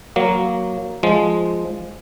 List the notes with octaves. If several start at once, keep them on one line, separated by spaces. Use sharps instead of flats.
F#3 A#3
F3 G#3